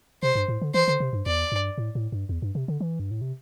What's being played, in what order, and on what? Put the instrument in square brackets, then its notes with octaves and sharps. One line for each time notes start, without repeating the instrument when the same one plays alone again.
[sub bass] C3 [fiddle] C5
[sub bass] G2
A2
D3
[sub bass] E3 [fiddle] C5
[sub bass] D3
C3
G2
[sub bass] E2 [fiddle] D5
[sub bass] G2
A2
A2
G2
E2
G2
C3
D3
E3
G2
A2
C3